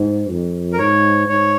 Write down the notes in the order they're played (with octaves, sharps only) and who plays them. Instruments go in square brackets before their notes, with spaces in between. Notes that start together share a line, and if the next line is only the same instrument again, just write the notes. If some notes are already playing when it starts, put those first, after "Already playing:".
Already playing: [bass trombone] G#2
F2
[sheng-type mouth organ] A#4
[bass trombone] G#2 [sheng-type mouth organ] C#5
[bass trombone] G#2 [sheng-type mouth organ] C#5